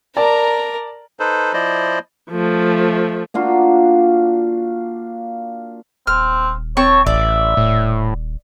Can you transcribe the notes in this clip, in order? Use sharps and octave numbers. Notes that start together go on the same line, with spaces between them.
A#4 D5 A5 A#5
D#4 A4 B4 C5
F3 E4 C5 D5 D#5
F3 A3
A#3 D4 F4 F#4
D#1 C4 F6
C4 C#5 A5 C#6
A1 D5 E5
D#1 A2